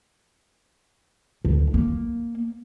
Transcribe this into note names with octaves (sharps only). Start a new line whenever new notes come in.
D2
A#3